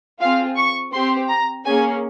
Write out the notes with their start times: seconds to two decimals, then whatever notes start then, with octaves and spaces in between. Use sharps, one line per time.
0.20 C4 F4 G#4 F5
0.57 C#6
0.93 C4 G4 C6
1.29 A#5
1.66 A#3 C#4 G#4 G#5